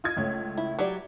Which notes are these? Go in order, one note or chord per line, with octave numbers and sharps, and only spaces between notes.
F4 D#6 G#6
C#2 A3 C#4
E4
F#3 G4 D5